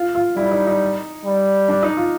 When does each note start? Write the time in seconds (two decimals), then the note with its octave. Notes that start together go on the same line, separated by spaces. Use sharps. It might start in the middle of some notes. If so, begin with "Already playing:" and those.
Already playing: F4
0.15 F4
0.37 G3 E4
0.51 D#4
0.67 D#4
1.25 G3
1.68 D4
1.83 D#4
1.97 F4